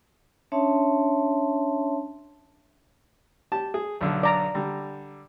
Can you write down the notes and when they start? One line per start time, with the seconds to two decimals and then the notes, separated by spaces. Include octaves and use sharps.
0.52 C#4 D4 C#5 E5 A5 C6
3.52 G4 A5
3.74 G#4
4.01 B1 D3
4.23 D5 A#5
4.55 D3 G3